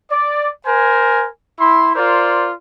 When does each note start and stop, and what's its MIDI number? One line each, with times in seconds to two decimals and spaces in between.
0.11 0.48 74
0.65 1.27 70
0.65 1.27 72
0.65 1.27 80
1.59 1.94 64
1.59 1.94 84
1.96 2.51 65
1.96 2.51 70
1.96 2.51 72
1.96 2.51 74